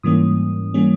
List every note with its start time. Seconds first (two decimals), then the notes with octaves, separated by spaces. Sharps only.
0.03 G#2 E3 G3 A#3 C#4 D#6
0.74 E3 G3 A#3 C#4